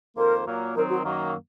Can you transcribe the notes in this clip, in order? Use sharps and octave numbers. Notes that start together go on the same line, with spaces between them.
F2 D#3 A#3 F4 A#4 C5
A#2 F#3 A#3
D#3 F#3 C4 D#4 A#4
F#4
F#2 D#3 F#3 A#3